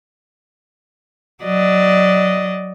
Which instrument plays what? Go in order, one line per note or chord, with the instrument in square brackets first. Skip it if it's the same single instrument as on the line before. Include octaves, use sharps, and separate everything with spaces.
[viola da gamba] F#3 D5 D#5